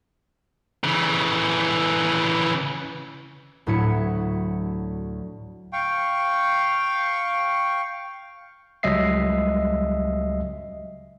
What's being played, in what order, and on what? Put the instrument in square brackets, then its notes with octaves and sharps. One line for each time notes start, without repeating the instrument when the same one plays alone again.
[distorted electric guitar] C#3 E3
[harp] D2 A2 F#3 E4 C#5 C#7
[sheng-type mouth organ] F5 G5 C#6
[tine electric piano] C#2 F#3 G3 D#5 E5 C7